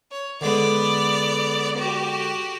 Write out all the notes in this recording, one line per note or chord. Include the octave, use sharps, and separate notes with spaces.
C#5
D3 G#3 B3 D5
F#4 G4